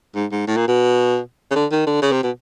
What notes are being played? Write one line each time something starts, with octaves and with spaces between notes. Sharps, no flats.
G#2
G#2
A2
A#2
B2
C#3
D3
D#3
D3
C#3
C3
B2